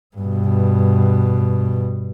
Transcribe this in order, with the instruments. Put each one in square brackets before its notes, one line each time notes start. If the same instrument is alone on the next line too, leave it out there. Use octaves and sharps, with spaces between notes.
[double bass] G2 B2